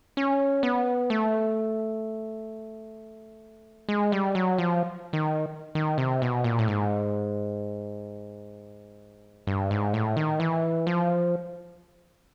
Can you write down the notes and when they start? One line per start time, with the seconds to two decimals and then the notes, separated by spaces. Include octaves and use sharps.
0.17 C#4
0.63 B3
1.10 A3
3.89 G#3
4.12 G3
4.35 F#3
4.58 F3
5.13 D#3
5.75 D#3
5.98 C3
6.22 B2
6.44 A#2
6.59 A2
6.68 G#2
9.47 G2
9.71 G#2
9.94 A2
10.17 D#3
10.40 E3
10.87 F3